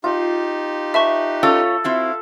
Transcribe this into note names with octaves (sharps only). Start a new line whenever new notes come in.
D#4 F4 G4
B4 E5 A5 C#6
C#4 F4 A4 C#5
C4 E4 F#4 F5